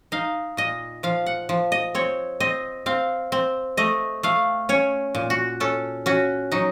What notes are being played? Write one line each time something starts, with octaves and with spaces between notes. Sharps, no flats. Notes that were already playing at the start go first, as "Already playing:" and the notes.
D#4 F5
A#2 D#5
F3 F5
F#5
F3
D#5
C4 C#5
C4 D#5
C4 F5
C4
A3 D#5
A3 F5
C#4 C#5
A#2
F#4
C#4 A4
C#4 F#4
F#3 D#4